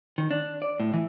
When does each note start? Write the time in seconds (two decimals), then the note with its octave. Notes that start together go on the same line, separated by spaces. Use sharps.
0.18 D#3
0.31 D4
0.62 D5
0.80 A2
0.94 E3